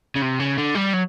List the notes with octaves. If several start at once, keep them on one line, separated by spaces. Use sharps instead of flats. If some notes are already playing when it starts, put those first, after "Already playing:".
C#3
C3
C#3
D3
G3
F#3